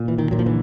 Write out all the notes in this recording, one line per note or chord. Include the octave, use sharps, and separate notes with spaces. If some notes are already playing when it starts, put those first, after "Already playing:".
Already playing: A#2
E3
D#3
A#2 F#3
F3
D3 E3